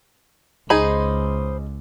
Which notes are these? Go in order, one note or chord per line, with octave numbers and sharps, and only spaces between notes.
C#2 D#4 G#4 C5 D#5 B5